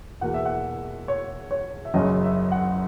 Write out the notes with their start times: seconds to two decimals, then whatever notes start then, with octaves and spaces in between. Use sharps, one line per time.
0.21 E2 B2 A#3 F#5
0.34 E5
0.45 F#5
1.08 C#5
1.51 C#5
1.85 E5
1.94 F#1 F#2 C#3 D#5
2.23 E5
2.52 F#5